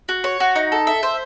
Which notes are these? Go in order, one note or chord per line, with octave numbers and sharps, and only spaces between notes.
F#4
C#5
F#4
D#4
A4
E5
C5